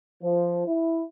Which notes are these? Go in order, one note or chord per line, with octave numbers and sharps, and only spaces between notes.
F3
E4